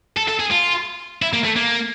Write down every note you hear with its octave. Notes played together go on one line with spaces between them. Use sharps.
A4
A4
G#4
F4
E4
A#3
A3
A#3